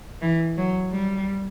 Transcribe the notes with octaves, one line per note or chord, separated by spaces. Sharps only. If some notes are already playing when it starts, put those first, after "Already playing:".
E3
F#3
G3